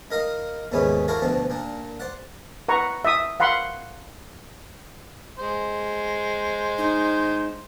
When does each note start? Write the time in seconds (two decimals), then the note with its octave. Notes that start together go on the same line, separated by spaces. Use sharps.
0.11 D#4 A#4 D#5 F5
0.72 D#2 G#2 C#3 B3 C#4 E4
1.08 E4 F#4 A4 A#4 D5 F5
1.22 D2 B2 F3 C4 D4
1.50 A#2 A#3 D4
2.00 C5 D5 F#5
2.69 B4 F#5 A#5 C#6
3.05 E5 D#6
3.40 F5 F#5 B5 C6
5.39 G#3 C5
6.78 D#4